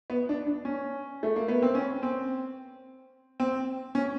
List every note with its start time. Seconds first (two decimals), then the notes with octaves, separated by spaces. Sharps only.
0.10 B3
0.29 D4
0.47 D4
0.65 C#4
1.23 A3
1.36 A#3
1.48 B3
1.62 C4
1.75 C#4
2.03 C4
3.40 C4
3.95 C#4